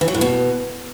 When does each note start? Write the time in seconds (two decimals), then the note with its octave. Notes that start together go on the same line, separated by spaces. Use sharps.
0.01 E3
0.08 F#3
0.14 A2
0.21 B2